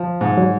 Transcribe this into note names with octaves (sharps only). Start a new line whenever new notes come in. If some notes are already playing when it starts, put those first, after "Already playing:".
Already playing: F3
G#2
F#3